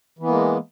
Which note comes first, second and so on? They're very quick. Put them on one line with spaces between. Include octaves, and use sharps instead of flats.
E3 B3 A#3 G#3